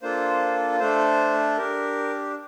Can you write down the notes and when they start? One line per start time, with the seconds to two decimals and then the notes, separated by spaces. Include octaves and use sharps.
0.02 A#3 D4 F4 A4 C5
0.79 A3 D4 A4 C5
1.57 D4 G4 A#4